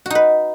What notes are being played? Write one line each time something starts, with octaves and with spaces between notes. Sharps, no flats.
D#4 F#4 B4